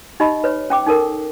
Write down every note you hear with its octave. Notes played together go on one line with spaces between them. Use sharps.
D#4 G4 D#5 B5
B4 C#5
C#4 G5 D6
D#4 A4 A#4